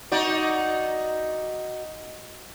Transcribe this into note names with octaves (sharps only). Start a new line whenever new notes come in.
D#4 F#4 D5